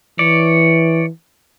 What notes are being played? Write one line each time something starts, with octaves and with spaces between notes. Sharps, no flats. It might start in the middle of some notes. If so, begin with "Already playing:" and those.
E3 C#5 D5